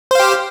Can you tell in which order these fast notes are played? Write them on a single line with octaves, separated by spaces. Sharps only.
C5 F5 G4